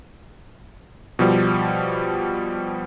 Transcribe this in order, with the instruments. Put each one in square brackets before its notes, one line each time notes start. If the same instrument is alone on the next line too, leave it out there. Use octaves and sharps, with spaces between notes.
[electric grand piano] B2 F3 G3